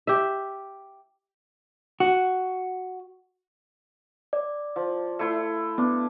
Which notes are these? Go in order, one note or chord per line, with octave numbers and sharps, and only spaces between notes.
G4 E5
F#4
D5
F3
A3 E4 C6
B3 D4